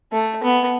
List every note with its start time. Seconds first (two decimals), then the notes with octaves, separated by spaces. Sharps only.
0.12 A3
0.43 B3